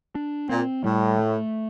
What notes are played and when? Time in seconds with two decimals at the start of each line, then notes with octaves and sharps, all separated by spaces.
0.15 D4
0.49 A#2 C4
0.84 A2 G3
1.19 A3